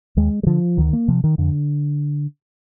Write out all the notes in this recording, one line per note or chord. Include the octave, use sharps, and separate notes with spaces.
D#2 G#3
G3
D3 F3
D2 D#3
A#3
C3 F3
D#3
F2 D3